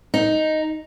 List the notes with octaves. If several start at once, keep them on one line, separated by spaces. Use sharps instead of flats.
D#4